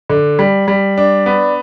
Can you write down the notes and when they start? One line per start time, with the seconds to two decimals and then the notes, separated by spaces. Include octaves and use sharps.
0.09 D3
0.39 G3
0.68 G3
0.98 D4
1.26 B3